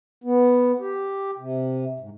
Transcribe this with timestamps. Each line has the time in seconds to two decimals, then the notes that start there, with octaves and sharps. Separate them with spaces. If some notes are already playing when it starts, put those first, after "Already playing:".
0.24 B3
0.80 G4
1.38 C3
2.00 G#2